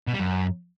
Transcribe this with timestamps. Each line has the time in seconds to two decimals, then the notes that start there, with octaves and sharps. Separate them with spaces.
0.07 B2
0.13 G3
0.19 F#2